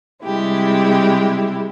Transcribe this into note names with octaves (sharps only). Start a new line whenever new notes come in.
C3 G3 G#3 E4 G4